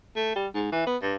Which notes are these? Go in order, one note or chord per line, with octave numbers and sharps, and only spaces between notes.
A3
G3
G#2
E3
B3
G2